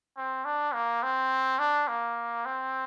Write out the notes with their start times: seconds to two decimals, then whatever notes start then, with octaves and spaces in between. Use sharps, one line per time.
0.17 C4
0.45 D4
0.74 A#3
1.03 C4
1.59 D4
1.88 A#3
2.45 C4